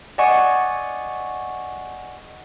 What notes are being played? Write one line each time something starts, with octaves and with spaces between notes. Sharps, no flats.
D5 D#5 F#5 G#5 C#6